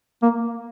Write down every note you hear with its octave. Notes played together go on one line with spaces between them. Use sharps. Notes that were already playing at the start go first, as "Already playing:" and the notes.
A#3